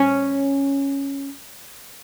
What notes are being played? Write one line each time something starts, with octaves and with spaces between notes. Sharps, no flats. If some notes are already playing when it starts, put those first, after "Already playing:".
Already playing: C#4